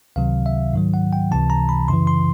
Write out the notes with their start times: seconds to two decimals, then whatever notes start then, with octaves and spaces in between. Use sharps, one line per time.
0.16 C#2 C3 D#3 F#3 F5
0.46 E5
0.73 G#2 D#3 F#3
0.94 F#5
1.13 G5
1.31 C#2 C3 E3 A5
1.50 A#5
1.69 B5
1.88 F#2 C#3 E3 C6
2.07 C6